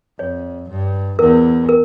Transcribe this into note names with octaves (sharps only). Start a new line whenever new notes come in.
F2 C#5
G2
E2 A#4
A#4